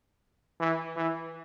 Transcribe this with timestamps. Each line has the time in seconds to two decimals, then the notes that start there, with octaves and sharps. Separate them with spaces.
0.60 E3
0.96 E3